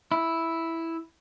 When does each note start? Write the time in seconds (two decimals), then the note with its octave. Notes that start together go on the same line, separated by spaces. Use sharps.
0.12 E4